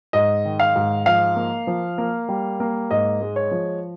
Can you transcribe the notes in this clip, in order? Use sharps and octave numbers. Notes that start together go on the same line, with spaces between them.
G#2 D#5
D#3
F5
G#2
F3 F5
A#3
F3
A#3
G3
A#3
G#2 D#5
G#3
C#5
F3